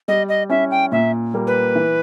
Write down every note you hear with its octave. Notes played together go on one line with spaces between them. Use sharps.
G3 D#5
D#5
C#4 E4 E5
G5
A#2 E5
G3 A#3
B4
E3